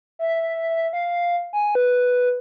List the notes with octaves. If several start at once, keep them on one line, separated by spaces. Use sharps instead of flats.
E5
F5
G#5
B4